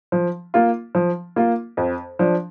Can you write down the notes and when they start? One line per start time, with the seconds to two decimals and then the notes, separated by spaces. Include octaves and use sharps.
0.12 F3
0.54 A#3 F4
0.95 F3
1.36 A#3 F4
1.77 F2
2.19 F3 D4